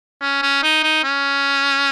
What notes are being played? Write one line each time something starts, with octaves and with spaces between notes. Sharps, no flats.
C#4
C#4
D#4
D#4
C#4